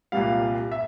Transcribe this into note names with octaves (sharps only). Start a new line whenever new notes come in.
C2 A#2 G3 F5
E5